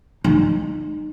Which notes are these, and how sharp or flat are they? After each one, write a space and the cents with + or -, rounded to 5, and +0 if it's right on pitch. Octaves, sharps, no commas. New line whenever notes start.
D#4 -30